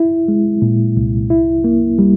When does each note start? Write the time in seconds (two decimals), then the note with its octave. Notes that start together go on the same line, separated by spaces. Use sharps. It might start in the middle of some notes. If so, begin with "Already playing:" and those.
Already playing: E4
0.28 G#3
0.62 A#2
0.97 C2
1.30 E4
1.64 A#3
1.99 G3